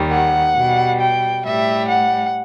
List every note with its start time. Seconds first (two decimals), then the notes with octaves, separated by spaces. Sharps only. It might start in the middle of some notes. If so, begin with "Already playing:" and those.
Already playing: D#2 D#3 G3
0.11 F#5
0.56 B2 G3
1.01 G5
1.45 A2 G3 E5
1.89 F#5